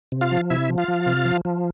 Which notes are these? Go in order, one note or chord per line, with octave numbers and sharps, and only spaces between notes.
C3
F4 F5
F3
C3 E4 E5
F3
F4 F5
F3
C3
F3
F3